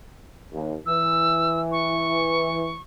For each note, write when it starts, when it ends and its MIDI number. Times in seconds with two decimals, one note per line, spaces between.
0.52 0.77 39
0.86 2.76 52
0.86 1.60 88
1.72 2.81 85